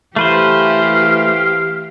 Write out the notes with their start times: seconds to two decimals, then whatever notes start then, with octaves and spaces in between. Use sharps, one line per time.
0.16 E3 A3 G4 B4 C5 F5